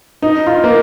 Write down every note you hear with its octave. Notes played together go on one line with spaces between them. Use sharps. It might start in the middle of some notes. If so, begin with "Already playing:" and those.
D#4
F4
A#3